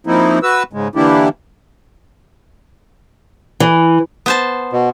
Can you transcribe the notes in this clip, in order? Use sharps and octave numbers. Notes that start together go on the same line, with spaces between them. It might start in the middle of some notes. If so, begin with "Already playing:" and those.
F3 A#3 C4 D#4 E4
F#4 B4 E6
G#2 C#3 G#3
D3 E3 A#3 D4 E4 G4
E3
B3 C5 A5
B2